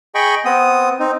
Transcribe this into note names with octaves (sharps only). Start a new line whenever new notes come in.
G#4 D#5 G5 B5 C#6
B3 C4 D#6
C4 D#4